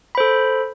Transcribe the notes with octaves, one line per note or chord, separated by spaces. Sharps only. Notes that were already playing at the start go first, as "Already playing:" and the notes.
A4 C5 B5